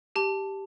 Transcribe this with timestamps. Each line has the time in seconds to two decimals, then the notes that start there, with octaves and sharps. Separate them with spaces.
0.16 G4 A5